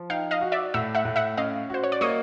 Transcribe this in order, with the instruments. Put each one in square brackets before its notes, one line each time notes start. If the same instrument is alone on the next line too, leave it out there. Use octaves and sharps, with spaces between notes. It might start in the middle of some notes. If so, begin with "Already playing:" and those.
Already playing: [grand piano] F3
[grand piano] D#4 [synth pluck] F5 G5
[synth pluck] D#5 F5
[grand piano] F#4
[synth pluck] D5 E5
[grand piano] A2 [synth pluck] E5 F#5
[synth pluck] E5 F#5
[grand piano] A2
[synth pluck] E5 F#5
[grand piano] C#4 [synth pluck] D#5 F5
[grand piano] F#4 [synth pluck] C5
[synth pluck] C#5
D5
[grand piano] A#3 [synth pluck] C#5 D#5